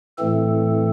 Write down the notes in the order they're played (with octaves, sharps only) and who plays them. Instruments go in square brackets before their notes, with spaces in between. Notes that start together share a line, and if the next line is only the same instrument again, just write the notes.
[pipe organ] A2 E3 A3 C4 A4